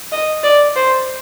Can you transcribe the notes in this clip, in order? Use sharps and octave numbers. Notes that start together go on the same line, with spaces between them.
D#5
D5
C5